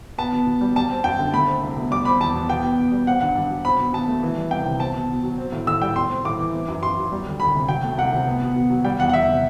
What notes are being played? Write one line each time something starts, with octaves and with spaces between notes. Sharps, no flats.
B3 A5
B2
B2
G3
G3 A5
C4
F#2 G5
D3
A3 B5
C4
C2
B2
G3 D6
C4 B5
E2 A5
B2
B3 G5
B2
B2
G3
C4 F#5
G2 F#5
G2
F#3
C4 B5
B2
B2 A5
A3
E3
G3
C2 G5
C3
C4 A5
B2
B2
F#3
C4
A2
A2 E6
G3 G5
G3 C6
C4
A2 D6
E3
C4
F#2
F#2 C6
F#3
G3
D2
D2 B5
C3
F#3 G5
A3
C2 F#5
C3
B3
B2
B2
F#3
G3 G5
E2 F#5
F#5
E2 E5
C3